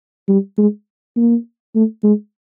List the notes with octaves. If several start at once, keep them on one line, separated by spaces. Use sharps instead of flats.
G3
G#3
A#3
A3
G#3